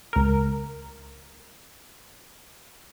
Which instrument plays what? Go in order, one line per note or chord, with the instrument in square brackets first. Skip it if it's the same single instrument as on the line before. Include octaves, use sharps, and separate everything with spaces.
[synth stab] C#2 A#4